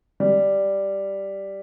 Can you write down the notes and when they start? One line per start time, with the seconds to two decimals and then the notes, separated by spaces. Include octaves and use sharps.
0.20 G3